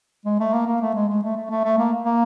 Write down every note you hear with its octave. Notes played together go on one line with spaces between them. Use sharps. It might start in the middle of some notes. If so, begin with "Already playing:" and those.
G#3
A3
A#3
A#3
A3
G#3
G#3
A3
A3
A3
A3
A#3
A#3